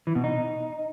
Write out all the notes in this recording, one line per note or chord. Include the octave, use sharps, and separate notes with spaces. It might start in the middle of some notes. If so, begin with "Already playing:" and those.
E3
B2
D#4